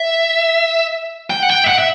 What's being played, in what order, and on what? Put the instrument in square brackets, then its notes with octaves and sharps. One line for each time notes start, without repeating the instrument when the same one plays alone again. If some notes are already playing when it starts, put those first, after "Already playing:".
Already playing: [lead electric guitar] E5
G5
F#5
G5
E5
F#5
E5